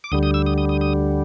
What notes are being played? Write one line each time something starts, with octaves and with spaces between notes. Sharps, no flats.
D6
D2 D3 G3 D#6
D#6
E6
D#6
D#6
D#6
D#6